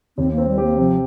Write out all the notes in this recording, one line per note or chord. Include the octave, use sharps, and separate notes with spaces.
D#2 C4
A#3
C4
G3
G4
A#3
C3 F3